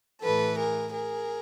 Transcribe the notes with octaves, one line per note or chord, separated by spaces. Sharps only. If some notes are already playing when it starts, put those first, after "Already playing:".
A2 E3 A4 B4
G#4 A#4
G#4 A#4